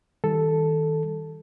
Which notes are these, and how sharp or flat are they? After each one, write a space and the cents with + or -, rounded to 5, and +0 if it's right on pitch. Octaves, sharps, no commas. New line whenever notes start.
D#3 +20 G3 +0 A4 +0